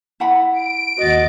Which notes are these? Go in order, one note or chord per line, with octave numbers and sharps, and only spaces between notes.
E4 F#5 B5
D7
D#2 F#4 D#5 A6